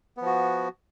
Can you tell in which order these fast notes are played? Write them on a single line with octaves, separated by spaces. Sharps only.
B3 F3 F#4